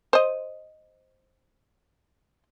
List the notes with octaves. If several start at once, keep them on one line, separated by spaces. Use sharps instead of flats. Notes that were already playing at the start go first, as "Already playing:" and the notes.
C5 D#5